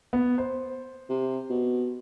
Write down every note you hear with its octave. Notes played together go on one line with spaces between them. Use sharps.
B3
C5
C3
B2